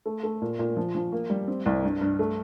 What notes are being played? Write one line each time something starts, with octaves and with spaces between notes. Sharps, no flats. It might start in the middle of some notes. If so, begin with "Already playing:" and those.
A3
A3
A#2
A#2
F3
F3
A#3
G3
C4
C2
G2
G2
A3